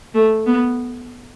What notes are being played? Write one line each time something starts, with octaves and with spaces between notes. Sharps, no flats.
A3
B3